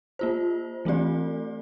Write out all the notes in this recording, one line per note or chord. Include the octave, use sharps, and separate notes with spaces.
A#3 F4 C5
E3 A3 C4 G4 D5